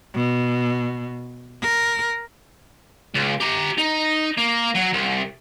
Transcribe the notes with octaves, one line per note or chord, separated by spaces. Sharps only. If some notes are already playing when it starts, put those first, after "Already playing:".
B2
A#4
C#2
G4 A#5
D#4
A#3
F#3
C2